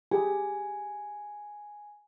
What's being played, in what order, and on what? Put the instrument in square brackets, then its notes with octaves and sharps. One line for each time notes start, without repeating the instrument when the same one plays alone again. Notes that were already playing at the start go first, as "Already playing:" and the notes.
[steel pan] G4 G#4 [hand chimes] G#5